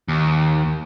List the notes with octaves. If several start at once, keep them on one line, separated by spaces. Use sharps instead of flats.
D#2